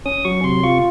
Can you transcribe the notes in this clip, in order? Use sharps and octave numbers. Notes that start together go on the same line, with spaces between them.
C#4 D#6
F#3 C#6
C3 C6
F4 C#6